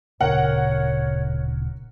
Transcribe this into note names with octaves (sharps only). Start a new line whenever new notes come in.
D1 A#2 C#3 A#4 C#5 F#5